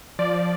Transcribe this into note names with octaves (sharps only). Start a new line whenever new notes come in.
F3 D5
F3